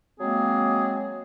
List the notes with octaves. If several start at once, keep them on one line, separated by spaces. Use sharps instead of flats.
F#3 G#3 A#3 C4 G#4